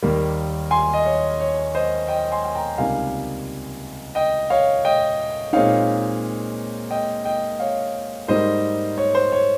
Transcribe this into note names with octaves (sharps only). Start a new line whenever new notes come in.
D#2 D#3 G3 A#3
G#5 C6
D#5
C#5
C#5
C5 D#5
D#5 G5
G#5 C6
G#5
G5 A#5
C#2 C3 G3 A#3 D#4 F5 G#5
D#5 G5
C#5 F5
D#5 G5
A#2 G#3 C4 D#4 C#5 F5
D#5 G5
D#5 G5
C#5 F5
G#2 G3 A#3 D#4 C5 D#5
C#5
C5
C#5